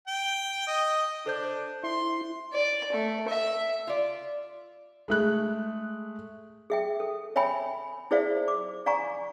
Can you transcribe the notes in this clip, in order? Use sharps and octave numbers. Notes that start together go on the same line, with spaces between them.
G5
D#5
D4 A4 C5 G6
E4 C6
D5
A3
E5
F4 D5
G#3 A3 F#6
G#4 E5 G5
A4
C#5 E5 G5 G#5 B5
E4 G#4 C5 D5 E5 F5
D6
D5 F5 G#5 A#5 C#6